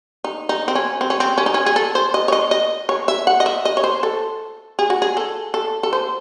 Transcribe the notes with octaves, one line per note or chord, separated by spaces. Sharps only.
D#4
D#4
C4
C#4
C4
C#4
C4
C#4
D#4
C#4
G#4
A4
C5
D#5
C#5
D#5
D#5
C#5
E5
F#5
D#5
E5
D#5
C#5
C5
A4
G#4
F#4
G#4
A4
A4
A4
C5